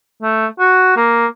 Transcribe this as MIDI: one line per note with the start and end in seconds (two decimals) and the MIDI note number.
0.23 0.46 57
0.60 0.93 66
0.97 1.26 58